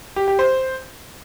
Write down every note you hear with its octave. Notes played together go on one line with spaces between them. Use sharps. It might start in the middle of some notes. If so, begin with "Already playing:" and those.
G4
G4
C5